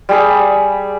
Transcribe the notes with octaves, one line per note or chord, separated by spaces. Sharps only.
G3 G#4 B5